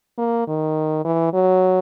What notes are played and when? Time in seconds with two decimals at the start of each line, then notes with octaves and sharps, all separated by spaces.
0.18 A#3
0.48 D#3
1.05 E3
1.34 F#3